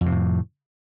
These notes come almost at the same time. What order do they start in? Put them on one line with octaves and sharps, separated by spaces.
F2 C3 A2